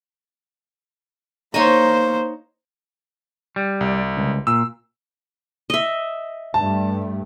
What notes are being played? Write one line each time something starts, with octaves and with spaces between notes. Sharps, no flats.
A#3 D#4 C5 C#5 D#5
G3
C2
C#2
A#2 E6
D#5 E5
G2 G3 A3 A5